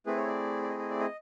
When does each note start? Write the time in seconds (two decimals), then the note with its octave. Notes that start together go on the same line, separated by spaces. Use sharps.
0.06 A3 C4 E4 G#4 B4
0.17 C#5
0.28 D5
0.63 D5
0.69 D#5
0.79 D#5
0.90 D5
1.00 D#5